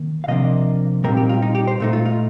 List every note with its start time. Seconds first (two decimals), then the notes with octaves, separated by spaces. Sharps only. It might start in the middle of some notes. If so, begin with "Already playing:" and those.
Already playing: D#3 A#3
0.24 F5
0.28 C3 F3 A#3 D4 D#5
1.04 A#2 G3 C4 D#4 A#4
1.17 G4
1.29 F4
1.42 D#4
1.55 G4
1.67 C5
1.80 A#2 A3 D#4
1.93 F4
2.06 F4